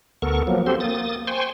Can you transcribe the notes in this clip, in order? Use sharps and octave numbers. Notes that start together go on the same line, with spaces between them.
D2 B3 A4 A#4 C#6
F3 F#3 A#3 B3
C4 F#4 G4 A4 C5 C6
A#3 D#6 A6
C5 G5 G#5 C6 C#6